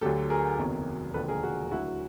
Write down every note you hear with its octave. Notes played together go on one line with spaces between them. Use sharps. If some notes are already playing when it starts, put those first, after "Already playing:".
D2 D3 F#3 G4 A4
G#4 A#4
F#1 E2 C3 D#3 F#3
E1 D#2 D3 F3 A4 B4
G#4 A#4
F#4 G#4
D2 D3 F#3 E4 F#4